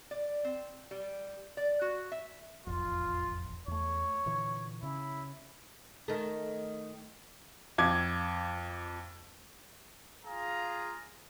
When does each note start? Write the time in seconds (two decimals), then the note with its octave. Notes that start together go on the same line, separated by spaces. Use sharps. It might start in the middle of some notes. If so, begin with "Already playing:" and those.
0.11 D5
0.44 C4
0.91 G3
1.57 D5
1.81 F#4
2.12 E5
2.67 E1 A1 F2 F4
3.68 E2 A3 C#5
4.26 A#2 D3 E3
4.83 C#3 C#4 E4
6.08 D#3 A3
7.78 F2 D6 G#6
10.24 F4 G#4 F5 A#5